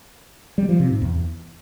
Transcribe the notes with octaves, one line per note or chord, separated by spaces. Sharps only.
G3
F3
C3
G#2
E2